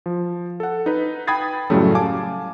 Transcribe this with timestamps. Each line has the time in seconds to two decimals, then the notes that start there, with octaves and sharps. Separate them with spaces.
0.06 F3
0.60 A4 F#5
0.86 D#4 B4
1.27 G5 B5 D#6 G#6 A6 C7
1.70 F#2 A2 C#3 F#3 G3 A3
1.94 F5 G#5 A5 D6